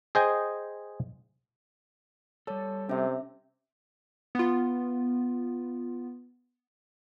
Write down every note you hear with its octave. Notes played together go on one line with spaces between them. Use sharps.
G#4 C5 D#5 G5 G#5
G3 A4 C#5 A5
C3 C#4 E5
B3 F4